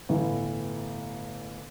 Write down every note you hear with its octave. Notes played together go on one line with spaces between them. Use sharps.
G1 A2 E3